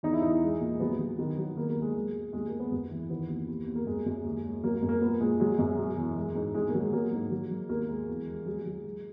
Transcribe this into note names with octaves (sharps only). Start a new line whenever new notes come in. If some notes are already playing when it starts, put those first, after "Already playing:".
E2 D#4
E4
E2 D#4
G#3
A#2
F#3 B3
F#3
D#3
F#3
D#3 A#3
A#3
D#2
G#3
G#3
G#3
D#2 G#3
A#3
D#2
B3
F#2
E3
D#3 B3
D#2
D#2
D#2
A#3
F#2 G#3
F#2
D#2
G#3
F#3 A#3
A#3
F#2
A#3
A#2 B3
A#2 G#3
F#3 G#3
F#2
B2
E2
G#3
G#2
G#2 G#3
A#3
F#3
G#3
F#3 A#3
G#2
F#3
F#3
D#2 A#3
G#3
E2
G#3
F#3 G#3
F#3
G#3